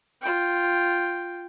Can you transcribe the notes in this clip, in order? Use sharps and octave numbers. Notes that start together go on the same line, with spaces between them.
F4 G5